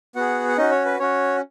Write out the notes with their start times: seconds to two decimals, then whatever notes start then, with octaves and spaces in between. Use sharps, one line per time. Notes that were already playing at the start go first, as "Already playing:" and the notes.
0.15 B3 F#4 G#4 F#5
0.49 F#5
0.58 C#4 D#4 F#4 D#5
0.71 C#5
0.85 B4
0.99 C#4 F#4 C#5